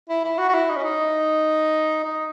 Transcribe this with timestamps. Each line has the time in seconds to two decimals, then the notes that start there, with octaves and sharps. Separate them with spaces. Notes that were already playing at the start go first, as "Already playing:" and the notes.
0.09 E4
0.24 E4
0.39 F#4
0.49 F#4
0.54 E4
0.69 D#4
0.77 C#4
0.84 D#4
2.04 D#4